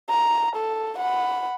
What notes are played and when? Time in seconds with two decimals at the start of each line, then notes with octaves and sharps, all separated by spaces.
0.10 A#5
0.56 A4
0.98 F#5 B5